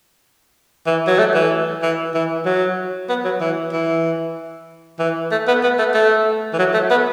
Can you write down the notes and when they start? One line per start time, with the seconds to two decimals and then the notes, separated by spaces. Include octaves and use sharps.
0.86 E3
1.07 F#3
1.19 A3
1.34 E3
1.82 E3
2.14 E3
2.45 F#3
3.09 B3
3.25 F#3
3.41 E3
3.73 E3
4.99 E3
5.31 A3
5.48 B3
5.63 B3
5.79 A3
5.94 A3
6.53 E3
6.59 F#3
6.74 A3
6.90 B3